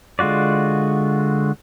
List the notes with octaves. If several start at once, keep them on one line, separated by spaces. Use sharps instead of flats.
D3 G#3 F4 F#4 D5